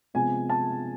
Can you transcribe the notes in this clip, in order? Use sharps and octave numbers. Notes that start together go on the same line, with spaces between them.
C3 F3 G#3 B3 G#5
A5